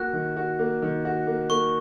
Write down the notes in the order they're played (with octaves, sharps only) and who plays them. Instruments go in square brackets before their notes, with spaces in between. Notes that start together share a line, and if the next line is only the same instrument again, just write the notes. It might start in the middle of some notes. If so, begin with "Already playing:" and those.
Already playing: [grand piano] A#3 F#4 [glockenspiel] F#6
[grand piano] D#3
F#4
A#3
D#3
F#4
A#3
[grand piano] A#3 [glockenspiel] C#6